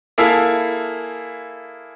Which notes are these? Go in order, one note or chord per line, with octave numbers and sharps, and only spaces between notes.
A#3 E4 G#4 A4 E5 F5